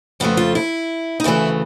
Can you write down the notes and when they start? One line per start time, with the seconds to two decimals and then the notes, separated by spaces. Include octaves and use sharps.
0.20 F2 C#3 F3 A3 B3
0.37 F4
0.55 E4
1.20 D#4
1.24 D2 C#3 E3 A3 E4